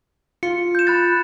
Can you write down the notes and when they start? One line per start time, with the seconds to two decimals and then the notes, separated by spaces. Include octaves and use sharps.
0.43 F4 C#7
0.75 G6 E7
0.87 B5 F#6 A6